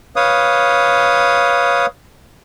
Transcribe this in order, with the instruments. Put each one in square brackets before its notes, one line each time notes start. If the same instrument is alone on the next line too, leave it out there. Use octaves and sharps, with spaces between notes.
[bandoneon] B4 C#5 F5 D#6